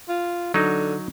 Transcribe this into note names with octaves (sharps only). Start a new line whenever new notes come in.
F4
D3 F#3 D#4